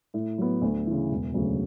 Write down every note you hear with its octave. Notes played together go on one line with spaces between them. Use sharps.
A2
F#3 B3
D2
C#3 E3
E1
D2 C#3 F#3